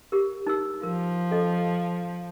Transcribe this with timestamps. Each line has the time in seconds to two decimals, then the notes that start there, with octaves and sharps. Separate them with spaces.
0.12 G4 A#4
0.47 D#4 A#4 E6
0.83 F3 A#4
1.31 C#4 A4 D#5